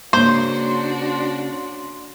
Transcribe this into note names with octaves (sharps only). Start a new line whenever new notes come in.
C#3 A#3 D4 F#4 C5 C6